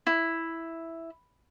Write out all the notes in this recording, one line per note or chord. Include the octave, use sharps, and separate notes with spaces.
E4